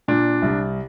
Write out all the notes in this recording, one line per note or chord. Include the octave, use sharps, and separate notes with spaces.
A#2 D4
C2